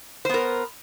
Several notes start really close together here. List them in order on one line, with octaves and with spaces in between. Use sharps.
C5 B3 A#4